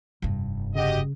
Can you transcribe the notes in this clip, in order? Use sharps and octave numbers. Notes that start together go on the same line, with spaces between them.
F1 G2
C#3 F#4 G4 D#5